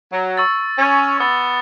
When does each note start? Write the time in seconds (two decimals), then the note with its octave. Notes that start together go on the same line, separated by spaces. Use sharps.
0.11 F#3
0.38 C#6 E6 A6
0.78 C#4
1.18 B3 C#6 E6 A6